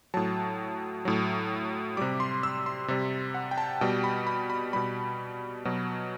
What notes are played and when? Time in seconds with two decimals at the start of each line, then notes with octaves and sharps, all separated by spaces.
0.14 A2 F#3 A5
1.05 A2 F#3
1.97 C3 G3 D6
2.20 C6
2.43 E6
2.66 C6
2.88 C3 G3
3.34 F#5
3.51 G5
3.58 A5
3.81 B2 G3 G5
4.04 B5
4.27 B5
4.50 B5
4.73 B2 G3 B5
5.65 B2 F#3